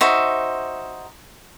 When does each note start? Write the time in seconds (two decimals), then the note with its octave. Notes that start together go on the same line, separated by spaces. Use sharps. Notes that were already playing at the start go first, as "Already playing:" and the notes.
0.01 D#4 F#4 C5 E5